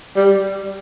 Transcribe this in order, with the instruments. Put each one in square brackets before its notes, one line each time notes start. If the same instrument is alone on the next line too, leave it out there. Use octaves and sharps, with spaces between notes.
[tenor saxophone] G3